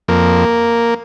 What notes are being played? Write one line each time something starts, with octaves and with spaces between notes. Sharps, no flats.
F2 A#3